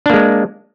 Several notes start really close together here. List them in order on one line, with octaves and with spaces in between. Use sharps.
D4 A#3 G#3